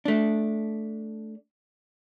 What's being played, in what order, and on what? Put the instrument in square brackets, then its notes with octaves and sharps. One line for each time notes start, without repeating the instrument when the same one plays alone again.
[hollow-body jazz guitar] A3 D4